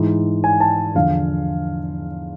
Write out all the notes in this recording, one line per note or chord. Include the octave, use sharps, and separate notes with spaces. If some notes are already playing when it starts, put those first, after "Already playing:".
Already playing: G#2 E3
G#5
A5
E2 D3 F3 F5